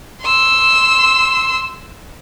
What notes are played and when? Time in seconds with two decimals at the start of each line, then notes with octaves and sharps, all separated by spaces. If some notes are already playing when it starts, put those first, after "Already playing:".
0.22 C6 E6